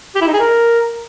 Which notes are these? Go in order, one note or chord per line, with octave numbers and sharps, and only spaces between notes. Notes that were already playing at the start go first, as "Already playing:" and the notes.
G4
E4
D#4
G#4
A#4